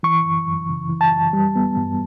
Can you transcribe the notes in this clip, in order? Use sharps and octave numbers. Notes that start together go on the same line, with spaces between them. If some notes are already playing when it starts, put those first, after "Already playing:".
E3 C#6
F#2
F#2
C#3
E3
A5
F#2
G3
B3
G2